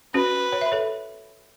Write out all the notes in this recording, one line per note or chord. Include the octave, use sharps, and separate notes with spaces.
C#4 F#4 B4
C#5
E5
A4 C#5